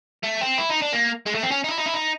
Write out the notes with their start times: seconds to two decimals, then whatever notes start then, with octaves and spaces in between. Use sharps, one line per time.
0.24 A3
0.41 C4
0.58 E4
0.70 D#4
0.81 D4
0.93 A#3
1.26 G#3
1.35 A3
1.43 C4
1.51 C#4
1.64 D#4
1.69 E4
1.78 D#4
1.86 E4
1.94 D#4